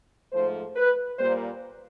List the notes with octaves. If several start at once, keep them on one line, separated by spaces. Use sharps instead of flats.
G#2 F3 A3 C5
B4
A#2 G3 A#3 C5